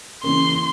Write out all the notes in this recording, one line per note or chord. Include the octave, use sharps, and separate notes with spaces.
C#3 E3 A#3 C#4 C6